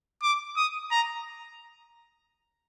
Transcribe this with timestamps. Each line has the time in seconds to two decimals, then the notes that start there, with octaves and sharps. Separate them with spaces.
0.23 D6
0.57 D#6
0.91 A#5